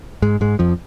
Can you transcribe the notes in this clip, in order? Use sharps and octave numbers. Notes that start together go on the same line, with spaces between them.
G#2 G#3
G#2 G#3
F2 F3